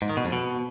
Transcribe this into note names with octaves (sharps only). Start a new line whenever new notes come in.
G#2
D#3
B2
F2
B2